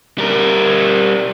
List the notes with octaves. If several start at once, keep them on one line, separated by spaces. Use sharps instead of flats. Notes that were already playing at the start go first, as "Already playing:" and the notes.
G3 A#4